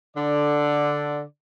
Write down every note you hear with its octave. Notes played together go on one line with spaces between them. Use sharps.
D3 D5